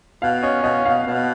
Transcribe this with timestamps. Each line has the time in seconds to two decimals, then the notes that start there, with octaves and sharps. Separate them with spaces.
0.22 B2 F5
0.43 C#4 D#5
0.63 B2 D#5
0.85 B2 F5
1.06 B2